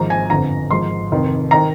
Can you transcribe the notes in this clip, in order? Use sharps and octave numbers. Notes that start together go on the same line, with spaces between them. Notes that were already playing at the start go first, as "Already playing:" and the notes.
Already playing: G#1 G#2 F3 A#5
G#5
G1 F2 D3 A#5
G#1 G#2 F3 C6
F1 F2 D#3
D#3 A#5